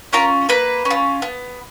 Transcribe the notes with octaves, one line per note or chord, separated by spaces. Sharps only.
C#4 F4 A#4 A#5
A#3 B4 B5
C#4
F4
B3